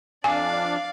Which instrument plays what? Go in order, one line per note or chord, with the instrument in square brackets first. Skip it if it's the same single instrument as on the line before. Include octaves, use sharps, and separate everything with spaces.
[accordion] F2 D4 [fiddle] D5 F5 [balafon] G#5